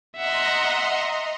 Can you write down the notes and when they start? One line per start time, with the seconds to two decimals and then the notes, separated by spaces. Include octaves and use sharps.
0.16 D#5 E5 F#5 A#5 C6